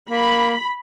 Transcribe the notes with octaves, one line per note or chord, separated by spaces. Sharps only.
A#3 B5